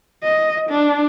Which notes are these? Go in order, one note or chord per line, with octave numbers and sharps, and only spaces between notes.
D#5
D4